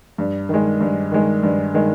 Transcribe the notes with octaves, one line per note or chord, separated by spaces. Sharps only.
G2
D#3 G#3
G2
D#3 G#3
G2
D#3 G#3